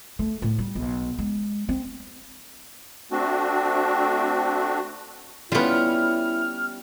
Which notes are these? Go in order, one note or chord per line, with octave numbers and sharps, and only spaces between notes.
A3
A2
G3
B1
G#3
C4
A3 C4 D4 F#4
G3 B3 C#4 E4 F4 F6